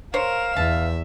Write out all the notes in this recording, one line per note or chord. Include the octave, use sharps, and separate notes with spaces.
A#4 C5 C#5 F5 E7
E2 E5 A5